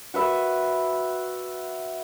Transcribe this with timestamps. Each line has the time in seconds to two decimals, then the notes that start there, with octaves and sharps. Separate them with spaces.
0.14 F#4 B4 E5